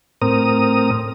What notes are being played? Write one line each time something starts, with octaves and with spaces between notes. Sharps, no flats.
A2 C4 A#4 D#6